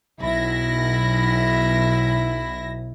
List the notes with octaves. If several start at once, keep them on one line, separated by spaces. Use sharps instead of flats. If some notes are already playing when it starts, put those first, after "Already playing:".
B1 E4 A#6